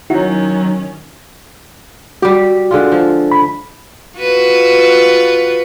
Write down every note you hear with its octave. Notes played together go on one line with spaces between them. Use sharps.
D#3 F#3 C#4 D#4 E4
G3 F#4 G4
D3 G#3 F4
F3
B5
F4 F#4 B4